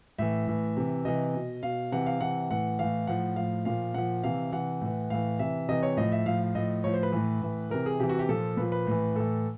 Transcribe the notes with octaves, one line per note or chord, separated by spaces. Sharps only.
A2 E3 E5
A2 E3
C3 E3
C3 E3 D#5
B2
B2 F5
C3 E3 F#5
F5
C3 E3 F#5
A2 E3 F#5
A2 E3 F5
A2 F3 F#5
A2 F3 F5
A#2 F3 F5
A#2 F3 F#5
C3 E3 F5
C3 E3 F#5
A2 E3
A2 E3 F5
C3 E3 E5
C3 E3 D#5
C#5
A2 F3 D#5
E5
A2 F3 F5
F5
A2 F3 D#5
A2 F3 C#5
C5
B4
A2 E3
A2 E3
C3 E3 A#4
G#4
C3 E3 G4
F#4
G4
A#2 F3 A4
A#2 F3 B4
B4
A2 E3
A2 E3 A4